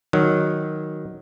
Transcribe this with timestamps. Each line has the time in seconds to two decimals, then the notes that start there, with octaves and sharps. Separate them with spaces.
0.13 D#3 F#3